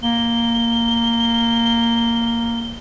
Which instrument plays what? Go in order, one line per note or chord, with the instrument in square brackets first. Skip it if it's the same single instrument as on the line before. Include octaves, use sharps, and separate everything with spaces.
[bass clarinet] A#3 [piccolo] G7